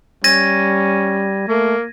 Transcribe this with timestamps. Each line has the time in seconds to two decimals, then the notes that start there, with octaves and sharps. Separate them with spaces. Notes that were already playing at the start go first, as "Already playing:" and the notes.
0.24 G3 C#4 G#6 A#6 D#7
1.48 A3 A#3